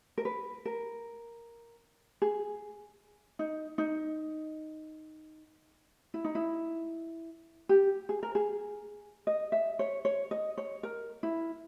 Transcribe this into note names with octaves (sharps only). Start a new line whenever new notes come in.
A#4
B4
A#4
G#4
D#4
D#4
E4
D#4
E4
G4
G#4
A#4
G#4
D#5
E5
C#5
C#5
D#5
C#5
A#4
E4